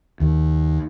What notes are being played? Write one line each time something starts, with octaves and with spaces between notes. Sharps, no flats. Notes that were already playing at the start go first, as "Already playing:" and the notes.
D#2